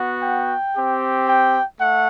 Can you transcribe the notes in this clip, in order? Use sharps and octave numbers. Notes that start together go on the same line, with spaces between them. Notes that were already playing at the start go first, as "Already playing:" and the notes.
Already playing: B3 F#4
G5
C4 G4
G5
A3 F#5